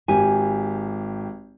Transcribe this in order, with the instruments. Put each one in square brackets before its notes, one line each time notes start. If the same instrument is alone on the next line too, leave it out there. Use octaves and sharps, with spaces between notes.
[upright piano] G#1 G4 [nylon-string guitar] G#5